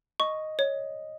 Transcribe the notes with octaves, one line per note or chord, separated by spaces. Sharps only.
D#5 C#6
C#5